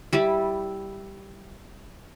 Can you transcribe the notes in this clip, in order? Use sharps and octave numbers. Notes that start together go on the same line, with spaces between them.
G3 E4